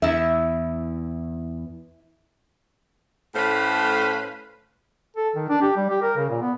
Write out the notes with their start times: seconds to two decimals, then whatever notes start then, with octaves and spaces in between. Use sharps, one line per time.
0.02 E2 E4 E5
3.35 A2 A3 C#4 B4 C5 F5
5.17 A4
5.36 D#3
5.49 D4
5.62 G4
5.77 G3
5.90 G4
6.02 A#4
6.17 C#3
6.30 A#2
6.42 B3